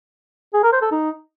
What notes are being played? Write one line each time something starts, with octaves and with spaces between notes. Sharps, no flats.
G#4
A#4
C5
A4
D#4